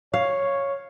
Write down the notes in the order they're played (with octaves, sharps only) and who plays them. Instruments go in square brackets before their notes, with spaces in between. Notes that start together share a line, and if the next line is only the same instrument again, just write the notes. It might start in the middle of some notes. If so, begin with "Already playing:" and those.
[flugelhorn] C#5 [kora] F5